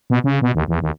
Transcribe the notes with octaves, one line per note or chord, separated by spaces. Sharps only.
B2
C#3
B2
D#2
E2
D#2